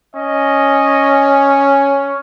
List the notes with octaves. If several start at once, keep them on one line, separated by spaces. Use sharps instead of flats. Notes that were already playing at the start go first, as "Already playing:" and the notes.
C#4 D#5